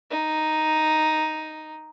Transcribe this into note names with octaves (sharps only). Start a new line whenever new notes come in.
D#4